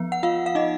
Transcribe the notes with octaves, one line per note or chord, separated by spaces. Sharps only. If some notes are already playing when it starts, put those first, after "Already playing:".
Already playing: F3 B3
F#5
F4 F5
F5
D#4 D#5